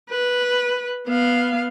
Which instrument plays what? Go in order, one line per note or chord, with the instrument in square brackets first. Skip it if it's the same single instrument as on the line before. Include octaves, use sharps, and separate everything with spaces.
[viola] B4
B3 F5